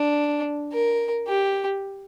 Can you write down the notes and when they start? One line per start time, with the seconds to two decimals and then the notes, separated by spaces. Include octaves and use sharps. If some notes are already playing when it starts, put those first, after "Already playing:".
Already playing: D4
0.73 A#4
1.28 G4